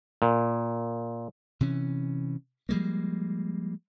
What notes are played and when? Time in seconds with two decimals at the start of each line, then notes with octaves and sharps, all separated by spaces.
0.22 A#2
1.61 C3 E3 C#4
2.69 F3 G3 G#3 A#3